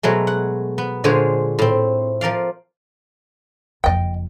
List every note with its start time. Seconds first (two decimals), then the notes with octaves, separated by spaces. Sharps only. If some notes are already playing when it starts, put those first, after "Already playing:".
0.03 B2 F#3 G#3 A3
0.27 F#5
0.78 B3
1.04 A#2 D3 G#3 G#4 C5 C#5
1.59 A2 C4
2.21 F3 A#4 D5 F5
3.84 F#1 F2 D#5 G5